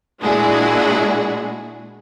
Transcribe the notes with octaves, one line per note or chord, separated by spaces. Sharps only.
A#2 G#3 D4 E4 F#4 G#4